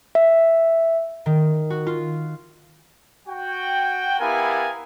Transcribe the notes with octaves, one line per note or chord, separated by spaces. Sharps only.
E5
D#3
F#4
F4
F#4 G5
B3 E4 G4 A#4 F5 G#5